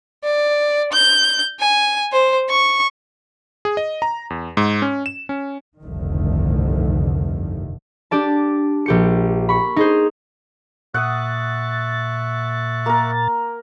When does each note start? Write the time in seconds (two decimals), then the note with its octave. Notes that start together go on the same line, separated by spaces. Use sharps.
0.23 D5
0.93 G6
1.60 G#5
2.12 C5
2.49 C#6
3.65 G#4
3.77 D#5
4.02 A#5
4.30 E2
4.57 G#2
4.82 C#4
5.06 E7
5.29 C#4
5.83 F1 C2 G2 D3 D#3 A3
8.11 D4 G4 D5 A5
8.86 A#1 G4 C#7
9.49 B5 C#6
9.76 D#4 G#4 C5
10.94 A#2 E5 F#5 C#6 D#6 F#6 A6
12.86 A#3 A#4